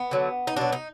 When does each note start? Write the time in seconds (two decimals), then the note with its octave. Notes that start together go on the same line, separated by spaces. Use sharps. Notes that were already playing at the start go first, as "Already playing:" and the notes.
Already playing: B3
0.11 D3 F#3
0.47 D#4
0.56 B2 F#3 D4
0.72 D#4